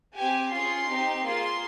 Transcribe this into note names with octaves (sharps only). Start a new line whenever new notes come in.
C4 G4 G#5
C#4 F4 G#4 C6
C4 D#4 G4
A#3 F4 G#4 C6